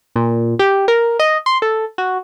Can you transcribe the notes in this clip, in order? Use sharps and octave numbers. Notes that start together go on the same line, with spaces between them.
A#2
G4
A#4
D#5
C6
A4
F#4